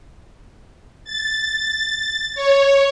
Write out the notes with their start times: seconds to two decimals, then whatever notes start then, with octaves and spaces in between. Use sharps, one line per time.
1.05 A6
2.35 C#5